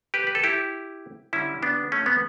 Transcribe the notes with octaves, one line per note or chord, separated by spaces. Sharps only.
G4 B4
B4
A4
E4 G4
D3 G3 C#4 E4
B3 D4
A3 C#4
B3